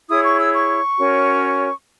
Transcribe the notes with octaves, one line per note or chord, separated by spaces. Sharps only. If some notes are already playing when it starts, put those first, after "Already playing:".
E4 G#4 C#5 D#6
C#6
E6
C#6
C#4 F#4 A#4 C#5